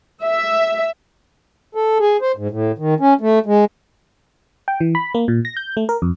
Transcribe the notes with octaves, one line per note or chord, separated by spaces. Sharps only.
E5
A4
G#4
C5
G#2
A2
D#3
C#4
A3
G#3
G5
E3
B5
A#3
A#2
A#6
G6
A3
A#4
F2